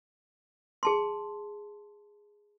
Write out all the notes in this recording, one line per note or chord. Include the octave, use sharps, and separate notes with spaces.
G#4 A5 C6